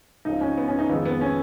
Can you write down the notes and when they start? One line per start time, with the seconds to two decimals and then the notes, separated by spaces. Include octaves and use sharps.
0.25 C#2 C#3 F3 D#4
0.41 C#4
0.58 B3
0.68 C#4
0.79 D#4
0.89 F2 D#3 G#3 B3
1.06 B3
1.21 C#4